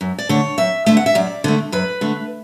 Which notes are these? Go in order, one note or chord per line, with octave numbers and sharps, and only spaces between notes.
F#2
D5
D3 A3 C#5
F#2 E5
D3 A3 E5
F#5
E5
F#2 D5
D3 A3
F#2 B4
D3 A3